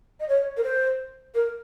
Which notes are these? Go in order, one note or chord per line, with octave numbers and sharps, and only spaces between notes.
D#5
C#5
A#4
C5
A#4